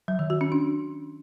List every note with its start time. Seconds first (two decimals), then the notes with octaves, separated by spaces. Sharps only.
0.08 F#3
0.19 D#3
0.30 F#4
0.41 C#4
0.52 D4